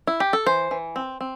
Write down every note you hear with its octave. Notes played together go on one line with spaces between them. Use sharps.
E4
G4
A4
E3 C5
E3
C4
C4